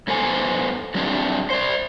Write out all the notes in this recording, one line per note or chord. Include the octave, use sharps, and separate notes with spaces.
G2 B3 A4 C5 G#5
F#3 G3 C4 D4 G#4
C5 D5